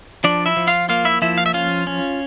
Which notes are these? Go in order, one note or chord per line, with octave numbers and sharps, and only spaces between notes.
F3 D4 D5
E4 E5
F3
F4 F5
A#3 F4 F5
E4 E5
F3 E4 E5
F5
E5
C#4 F4 F5
C#4